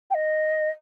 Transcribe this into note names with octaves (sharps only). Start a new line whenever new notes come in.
G5
D#5